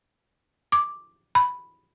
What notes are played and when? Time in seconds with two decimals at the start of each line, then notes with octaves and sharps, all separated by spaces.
0.72 D6
1.35 B5